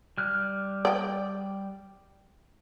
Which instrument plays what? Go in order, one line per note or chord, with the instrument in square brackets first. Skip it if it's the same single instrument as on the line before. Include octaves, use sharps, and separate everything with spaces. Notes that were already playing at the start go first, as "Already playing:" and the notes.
[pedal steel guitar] G3 F6 F#6
[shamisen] D5 G5